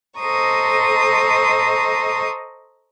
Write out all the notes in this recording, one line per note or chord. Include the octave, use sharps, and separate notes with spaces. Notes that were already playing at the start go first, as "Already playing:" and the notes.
A4 C5 D#5 A#5 C#6 D#6